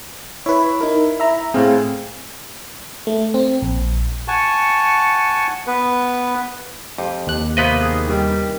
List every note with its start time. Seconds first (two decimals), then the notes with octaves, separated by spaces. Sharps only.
0.46 E4 B4 C#5
0.81 D#4 A#4
1.20 E5 A#5
1.54 A2 C4 G#4 F5
3.07 A3
3.34 C4
3.62 A#1
4.28 F#5 G#5 A5 C#6
5.67 B3 B4
6.98 F2 G4
7.27 D#2 F#6
7.57 C3 A#3 B3 B4 C5 D#5
7.81 D#3 G#4
8.09 G2 D#3 G3